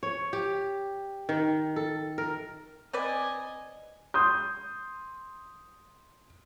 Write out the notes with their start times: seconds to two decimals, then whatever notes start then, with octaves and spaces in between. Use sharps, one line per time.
0.03 C#5
0.33 G4
1.29 D#3
1.76 A4
2.18 A#4
2.93 C4 B4 D5 D#5 G#5
4.14 C6 D#6 G6